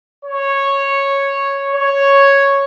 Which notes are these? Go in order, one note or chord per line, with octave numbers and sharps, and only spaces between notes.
C#5
C#5